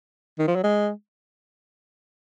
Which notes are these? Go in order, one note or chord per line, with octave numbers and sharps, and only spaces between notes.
D#3
F3
F#3
G#3